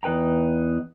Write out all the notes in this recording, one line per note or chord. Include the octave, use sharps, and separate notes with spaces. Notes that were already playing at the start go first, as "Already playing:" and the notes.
E2 D#4 B4 G5 A#5